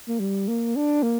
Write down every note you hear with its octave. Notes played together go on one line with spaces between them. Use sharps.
A#3
G3
A#3
D4
A#3